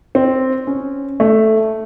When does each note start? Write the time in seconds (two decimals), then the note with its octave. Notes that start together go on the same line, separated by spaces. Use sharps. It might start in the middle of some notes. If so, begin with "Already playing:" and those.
0.15 C4
0.67 C#4
1.20 A3